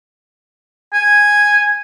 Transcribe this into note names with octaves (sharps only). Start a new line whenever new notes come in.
G#5